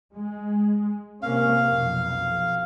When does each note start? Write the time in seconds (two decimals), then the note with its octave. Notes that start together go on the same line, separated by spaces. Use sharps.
0.14 G#3
1.23 C3 A#3 C#4 F5
1.65 B1 F2